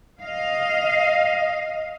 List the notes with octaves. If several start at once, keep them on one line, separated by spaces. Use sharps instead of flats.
D#5 F5